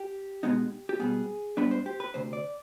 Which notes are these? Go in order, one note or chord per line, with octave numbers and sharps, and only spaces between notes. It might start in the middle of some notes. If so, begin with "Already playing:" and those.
Already playing: G4
B2 G#3 B3 D#4
G4
B2 G3 B3 G#4
G#2 G3 B3 D4 B4
C5
G4
B4
D2 C3 C5
D5